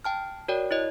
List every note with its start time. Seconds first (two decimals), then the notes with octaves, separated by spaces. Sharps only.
0.04 G5 A5 F6
0.48 F#4 A#4 C#5 D5 G5
0.71 E4 C#5 D#5